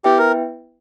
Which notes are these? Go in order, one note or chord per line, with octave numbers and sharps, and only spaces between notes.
B3 E4 G4 B4 E5 G5
A#4